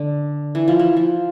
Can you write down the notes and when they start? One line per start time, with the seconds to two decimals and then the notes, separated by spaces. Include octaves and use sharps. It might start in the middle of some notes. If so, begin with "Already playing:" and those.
Already playing: D3
0.55 E3
0.68 F3
0.79 E3
0.97 F3